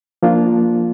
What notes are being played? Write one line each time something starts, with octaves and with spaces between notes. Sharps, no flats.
F3 A#3 D4 F4